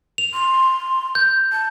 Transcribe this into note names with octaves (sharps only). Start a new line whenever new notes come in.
F7
C6
G6
A5